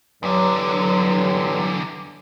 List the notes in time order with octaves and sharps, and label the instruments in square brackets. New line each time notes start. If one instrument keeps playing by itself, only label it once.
[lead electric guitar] E2 D3 [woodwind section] G2 F#3